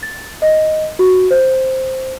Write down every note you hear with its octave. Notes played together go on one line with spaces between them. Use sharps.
A6
D#5
F#4
C5